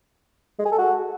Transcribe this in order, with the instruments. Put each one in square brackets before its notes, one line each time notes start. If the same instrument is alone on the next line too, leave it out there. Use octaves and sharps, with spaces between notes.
[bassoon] G#3
G#4
A4
F#4